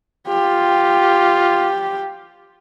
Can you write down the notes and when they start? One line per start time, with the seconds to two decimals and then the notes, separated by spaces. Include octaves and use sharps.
0.28 F4 G4